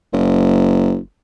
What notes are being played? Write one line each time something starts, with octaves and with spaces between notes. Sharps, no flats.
F#1